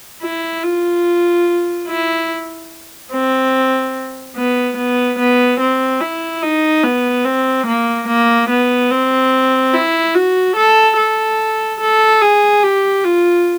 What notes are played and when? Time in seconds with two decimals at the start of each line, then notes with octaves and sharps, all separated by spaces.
0.22 E4
0.63 F4
1.87 E4
3.12 C4
4.36 B3
4.77 B3
5.19 B3
5.60 C4
6.01 E4
6.42 D#4
6.84 B3
7.25 C4
7.67 A#3
8.08 A#3
8.50 B3
8.91 C4
9.74 E4
10.15 F#4
10.56 A4
10.97 A4
11.80 A4
12.22 G#4
12.63 G4
13.04 F4